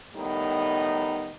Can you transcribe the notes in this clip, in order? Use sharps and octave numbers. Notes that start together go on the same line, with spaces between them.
A2 D#3 G3 B3 D#4